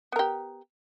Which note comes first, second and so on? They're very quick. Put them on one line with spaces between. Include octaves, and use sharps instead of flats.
B3 A#4 G4